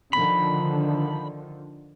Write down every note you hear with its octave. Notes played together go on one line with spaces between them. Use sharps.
D3 D#3 F3 B5